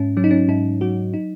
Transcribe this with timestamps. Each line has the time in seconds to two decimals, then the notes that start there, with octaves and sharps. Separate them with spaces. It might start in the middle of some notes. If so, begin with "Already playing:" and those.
Already playing: G#2 C#4
0.17 F#3 C#4
0.24 D#4
0.31 C#4
0.49 G#2 D#4
0.81 F#3 F#4
1.14 D#4